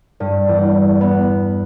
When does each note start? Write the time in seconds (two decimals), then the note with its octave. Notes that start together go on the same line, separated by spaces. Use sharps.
0.20 G2
0.49 E2
1.01 B3